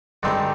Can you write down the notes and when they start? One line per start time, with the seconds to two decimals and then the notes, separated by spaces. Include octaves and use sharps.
0.23 G2 D3 G#3 C4 D#4